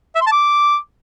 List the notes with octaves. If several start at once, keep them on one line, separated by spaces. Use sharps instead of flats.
E5
C6
A5
D6